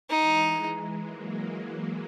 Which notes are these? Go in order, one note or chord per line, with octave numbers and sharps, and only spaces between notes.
E3 G#3 D#4
F#3 A#3